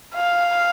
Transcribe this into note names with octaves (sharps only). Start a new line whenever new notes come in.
F5